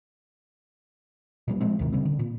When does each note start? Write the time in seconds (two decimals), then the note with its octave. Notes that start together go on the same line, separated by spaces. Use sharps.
1.48 A#2 F#3 G3
1.60 F3 G#3 C4
1.79 G1 D2 C3 D#3
1.92 C#3 G3 C4
2.05 D3
2.19 A#2